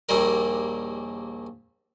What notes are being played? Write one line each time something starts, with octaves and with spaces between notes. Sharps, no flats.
A#1 D#2 A#2 G3 A#4